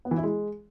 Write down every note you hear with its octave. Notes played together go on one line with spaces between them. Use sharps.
B3
E3
E4
G#3